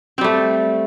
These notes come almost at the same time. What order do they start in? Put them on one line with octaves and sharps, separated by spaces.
C4 G3 A3